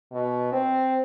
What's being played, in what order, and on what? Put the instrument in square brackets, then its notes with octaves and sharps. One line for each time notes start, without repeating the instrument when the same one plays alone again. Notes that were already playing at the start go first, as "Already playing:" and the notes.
[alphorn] B2
C4